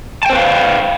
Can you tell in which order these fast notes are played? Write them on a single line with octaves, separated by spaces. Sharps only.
A5 G5 C5 B4 F5